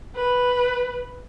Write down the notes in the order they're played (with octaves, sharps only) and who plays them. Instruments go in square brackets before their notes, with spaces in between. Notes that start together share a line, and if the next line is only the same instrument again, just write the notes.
[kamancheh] B4